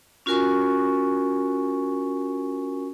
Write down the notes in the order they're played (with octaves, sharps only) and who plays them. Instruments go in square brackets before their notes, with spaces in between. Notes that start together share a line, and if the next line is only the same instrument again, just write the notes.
[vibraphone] C#4 F4 F#4 A#4 G#5 C#6